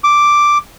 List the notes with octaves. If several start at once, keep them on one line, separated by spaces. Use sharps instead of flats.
D6